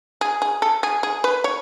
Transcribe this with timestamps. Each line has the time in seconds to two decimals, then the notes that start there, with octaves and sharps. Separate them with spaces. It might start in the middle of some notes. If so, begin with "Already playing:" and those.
0.21 G#4
0.42 G#4
0.62 A4
0.83 G#4
1.03 G#4
1.24 B4
1.44 C#5